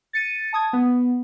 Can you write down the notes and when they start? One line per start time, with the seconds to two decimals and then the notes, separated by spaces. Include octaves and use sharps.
0.13 A6 C#7 D#7
0.53 A5 D#6 G#6
0.73 B3